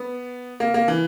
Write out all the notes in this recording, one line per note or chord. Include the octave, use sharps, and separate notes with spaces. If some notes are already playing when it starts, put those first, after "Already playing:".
Already playing: B3
A#3
A#3
E3